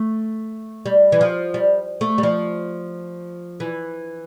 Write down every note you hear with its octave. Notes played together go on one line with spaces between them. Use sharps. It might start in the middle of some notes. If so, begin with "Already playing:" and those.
Already playing: A3
G3
E3
F3
G3
A3
G3
F3
E3